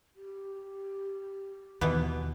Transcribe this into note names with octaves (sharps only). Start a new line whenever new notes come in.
G4
D#2 B2 E3 B3